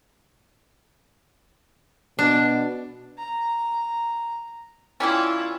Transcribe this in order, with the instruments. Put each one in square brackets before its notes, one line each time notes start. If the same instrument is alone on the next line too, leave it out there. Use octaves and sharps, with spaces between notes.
[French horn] B2 [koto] D4
[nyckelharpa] A#5
[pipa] E3 G3 C#4 [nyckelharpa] E4 F4